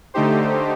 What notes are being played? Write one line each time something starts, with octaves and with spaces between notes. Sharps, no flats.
D3 A3 D#4 G4 C5